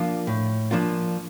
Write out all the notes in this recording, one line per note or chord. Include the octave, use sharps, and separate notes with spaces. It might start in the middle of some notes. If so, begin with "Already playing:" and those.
Already playing: F3 A#3 D4 F4
A2
F3 A#3 D4 F4